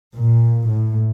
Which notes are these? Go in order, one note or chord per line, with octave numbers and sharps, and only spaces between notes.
A#2
A2